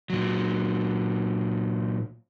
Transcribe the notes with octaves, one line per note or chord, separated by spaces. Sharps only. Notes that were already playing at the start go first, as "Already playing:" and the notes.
A#2 F#3